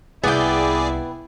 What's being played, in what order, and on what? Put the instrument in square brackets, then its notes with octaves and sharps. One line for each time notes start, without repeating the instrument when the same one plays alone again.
[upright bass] C2 [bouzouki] B3 G5 [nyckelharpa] E4 [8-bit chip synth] G#4 D5